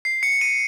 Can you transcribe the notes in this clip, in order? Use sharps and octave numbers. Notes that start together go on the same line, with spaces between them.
C7
C#7
D#7